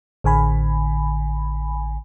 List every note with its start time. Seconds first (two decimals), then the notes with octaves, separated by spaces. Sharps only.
0.24 A1 D3 G#5 B5